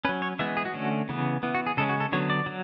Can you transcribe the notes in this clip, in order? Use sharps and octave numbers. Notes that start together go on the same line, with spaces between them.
F#3 C#4 B4
C#5
E3 G#3 B3 E5
G#4
F#4
D3 A3 C#4
C#3 E3 B3
E3 B3
F#4
G#4
C#3 G#3 C#4 A4
F#4
A4
D3 F#3 B3 C#5
D5
F#3